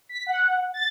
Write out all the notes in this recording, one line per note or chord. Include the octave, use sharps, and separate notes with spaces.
B6
F#5
A6